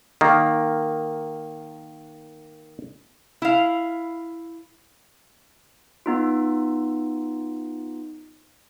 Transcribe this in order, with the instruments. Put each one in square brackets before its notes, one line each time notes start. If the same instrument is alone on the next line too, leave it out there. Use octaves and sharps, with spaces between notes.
[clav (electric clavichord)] D#3 A#3
[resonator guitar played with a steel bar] E4 F5
[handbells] B3 D#4 F4